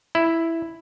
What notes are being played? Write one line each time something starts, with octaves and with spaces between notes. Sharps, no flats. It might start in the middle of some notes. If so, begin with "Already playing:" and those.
E4